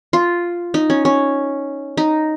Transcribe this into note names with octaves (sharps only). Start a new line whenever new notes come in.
F4
D#4
C#4
C#4
D#4